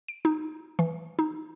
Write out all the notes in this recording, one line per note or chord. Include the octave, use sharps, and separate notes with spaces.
D7
D#4
E3
D#4